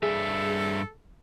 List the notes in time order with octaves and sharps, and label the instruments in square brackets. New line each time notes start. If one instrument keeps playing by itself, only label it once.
[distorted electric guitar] G2 E5 [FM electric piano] G#4 [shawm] A4